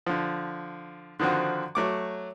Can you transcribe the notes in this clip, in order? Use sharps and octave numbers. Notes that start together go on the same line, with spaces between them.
D3 F3
D3 D#3 F3 C4 F#4
F#3 A3 D6